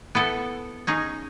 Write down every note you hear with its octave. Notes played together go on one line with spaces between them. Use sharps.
B3 E4 A4
C#4 D#4 G#4